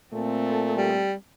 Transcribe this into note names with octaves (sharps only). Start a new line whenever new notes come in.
A#2 A3 C4 A4
G3